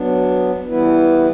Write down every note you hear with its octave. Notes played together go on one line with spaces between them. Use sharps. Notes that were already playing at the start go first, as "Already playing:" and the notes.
Already playing: F#3 B3 D4
E3 G3 B3 E4 B4